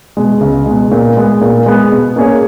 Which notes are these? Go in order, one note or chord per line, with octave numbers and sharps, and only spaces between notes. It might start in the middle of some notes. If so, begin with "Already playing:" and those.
B2 G#3
C#2
B2 G#3
A#2
G#3 B3
A#2
G#3 B3
B2
A#3 C#4 G#4 C#5